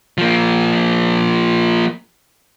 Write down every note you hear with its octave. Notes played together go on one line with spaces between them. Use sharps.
F3 A#3